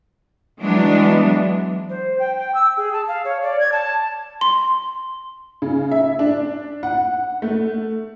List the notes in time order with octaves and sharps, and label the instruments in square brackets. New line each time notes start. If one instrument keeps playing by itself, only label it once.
[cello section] E3 F#3 G#3 B3 D4
[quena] C5
G5
G5
E6
G#4
A5
F5
C#5
D5
G#6
A5
[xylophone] C6
[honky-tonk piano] C#3
E5
D4
F#5
A3